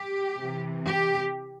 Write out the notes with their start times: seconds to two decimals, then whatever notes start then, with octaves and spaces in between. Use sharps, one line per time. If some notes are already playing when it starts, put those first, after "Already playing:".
Already playing: G4
0.38 C3 E3
0.86 G4